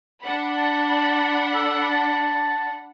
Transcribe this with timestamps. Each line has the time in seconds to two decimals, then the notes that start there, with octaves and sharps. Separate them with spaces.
0.22 D4 F#5 B5
0.58 A5
1.54 A4
1.90 A5